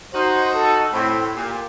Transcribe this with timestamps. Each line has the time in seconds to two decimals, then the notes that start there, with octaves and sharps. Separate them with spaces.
0.13 D#4 F#4 C5
0.54 A4
0.93 A2 C4
1.34 A#2 G4